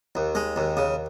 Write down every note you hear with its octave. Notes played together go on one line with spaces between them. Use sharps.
D#2
G#3
D#2
C#3